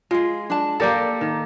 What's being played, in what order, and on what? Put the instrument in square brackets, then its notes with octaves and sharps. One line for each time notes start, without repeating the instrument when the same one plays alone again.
[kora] G#3 [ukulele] F4 G#4
[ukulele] D4 A5
[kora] A#3 G4 A4 [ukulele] A#4 D5
[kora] D#3